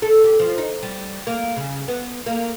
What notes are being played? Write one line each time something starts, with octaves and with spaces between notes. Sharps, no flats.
A4
G4
F3
D#4
G3
A#3
C#3
B3
A#3